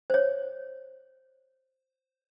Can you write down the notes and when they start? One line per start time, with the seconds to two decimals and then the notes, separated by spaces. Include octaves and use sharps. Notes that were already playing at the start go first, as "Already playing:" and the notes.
0.10 C5 C#5